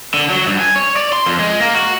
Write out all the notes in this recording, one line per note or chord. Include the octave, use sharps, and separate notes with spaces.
D3
F#3
G2
G#5
C#5
D5
C6
F2
G#3
A#3
F#4